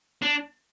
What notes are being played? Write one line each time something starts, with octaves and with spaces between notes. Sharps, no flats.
D4